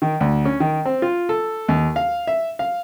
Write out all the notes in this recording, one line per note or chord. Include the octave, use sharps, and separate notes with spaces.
D#3
D2
C#4
D#3
C4
F4
A4
D#2
F5
E5
F5